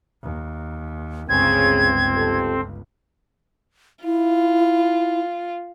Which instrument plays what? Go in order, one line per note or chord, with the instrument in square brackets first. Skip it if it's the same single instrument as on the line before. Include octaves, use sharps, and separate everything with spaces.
[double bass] D#2
[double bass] G1 C#2 [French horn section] C#3 [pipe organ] C4 [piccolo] G#6
[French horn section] F2 G4 A4
[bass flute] E4 [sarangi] F4